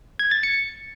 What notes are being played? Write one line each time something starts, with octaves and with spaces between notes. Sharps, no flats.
G#6
A6
C#7